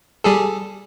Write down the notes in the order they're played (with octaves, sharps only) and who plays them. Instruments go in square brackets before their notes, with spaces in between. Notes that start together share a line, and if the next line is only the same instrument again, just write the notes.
[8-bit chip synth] G3 G#4 A4